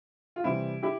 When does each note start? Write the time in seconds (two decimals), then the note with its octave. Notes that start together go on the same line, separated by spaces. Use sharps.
0.36 F4
0.44 C3 E3 G3 C4 E4
0.83 E4 G4